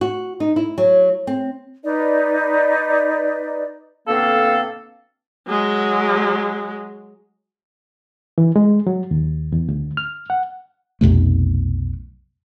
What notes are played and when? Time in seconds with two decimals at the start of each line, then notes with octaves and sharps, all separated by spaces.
0.01 F#4
0.40 D#4
0.56 E4
0.78 F#3
1.27 C4
1.84 D#4 B4 D5 D#5
4.08 B2 D3 A#3 C4 A4 F5
5.48 F#3 G#3
8.38 E3
8.56 G#3
8.87 F#3
9.11 D#2
9.52 E2
9.68 D2
9.97 F6
10.30 F#5
11.01 B1 F2 C3 A3